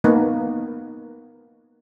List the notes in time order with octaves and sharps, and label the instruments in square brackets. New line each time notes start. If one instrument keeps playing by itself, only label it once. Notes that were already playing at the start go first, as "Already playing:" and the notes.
[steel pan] A#3 B3 D#4 B4